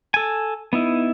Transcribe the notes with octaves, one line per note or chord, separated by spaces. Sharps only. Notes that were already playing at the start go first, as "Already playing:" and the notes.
A4 G#5
B3 D#4 E4